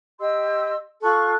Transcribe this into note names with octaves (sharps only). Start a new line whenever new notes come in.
G4 D#5 C6 E6
F4 A4 C#6 F#6